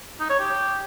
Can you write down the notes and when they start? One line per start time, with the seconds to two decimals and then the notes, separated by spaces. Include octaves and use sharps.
0.20 D#4
0.30 C#5
0.39 G4